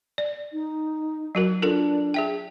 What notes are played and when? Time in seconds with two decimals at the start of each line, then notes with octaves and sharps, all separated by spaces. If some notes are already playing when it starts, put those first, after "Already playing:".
0.18 D5
0.53 D#4
1.35 F#3 F#4 A#4
1.62 D4 F4 A4 A#4
2.14 G#4 E5 G5